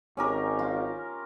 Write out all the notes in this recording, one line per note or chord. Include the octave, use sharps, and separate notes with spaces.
G#1 C#4 G4 A#4
F4